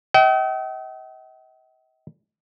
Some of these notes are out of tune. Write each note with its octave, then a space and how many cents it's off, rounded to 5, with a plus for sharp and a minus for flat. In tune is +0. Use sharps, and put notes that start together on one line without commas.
D#5 +45 G5 -45